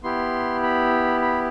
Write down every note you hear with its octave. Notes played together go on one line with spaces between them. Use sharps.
B3 E4 G4 C6
B5
B5